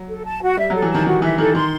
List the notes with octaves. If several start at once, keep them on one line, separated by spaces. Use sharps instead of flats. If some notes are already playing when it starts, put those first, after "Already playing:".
Already playing: F#3
A4
A5
F#4
G3 E5
F#3 A4
E3
D#3 A5
D#3 F#4
E3 E5
D#3 A4
D#3 C6